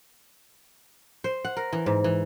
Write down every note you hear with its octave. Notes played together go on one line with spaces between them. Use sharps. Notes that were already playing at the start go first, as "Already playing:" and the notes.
C5
F#5
A#4
E3
G#2
E3